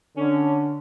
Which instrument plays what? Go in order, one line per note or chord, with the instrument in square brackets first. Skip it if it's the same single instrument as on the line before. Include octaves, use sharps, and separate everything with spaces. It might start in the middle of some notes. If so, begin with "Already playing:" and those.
[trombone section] D3 [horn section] C#4